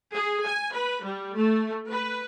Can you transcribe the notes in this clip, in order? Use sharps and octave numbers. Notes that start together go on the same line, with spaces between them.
G#4
G#5
B4
G3
A3
B4